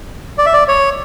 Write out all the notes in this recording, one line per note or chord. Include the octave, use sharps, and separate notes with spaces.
D5
E5
D5
C#5